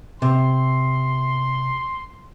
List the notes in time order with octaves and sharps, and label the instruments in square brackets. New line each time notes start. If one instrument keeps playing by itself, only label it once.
[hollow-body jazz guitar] C3 [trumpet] C6